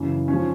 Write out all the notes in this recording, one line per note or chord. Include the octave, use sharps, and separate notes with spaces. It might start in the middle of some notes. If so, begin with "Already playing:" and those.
Already playing: F#2 C#3 E3
G#2 F3 C#4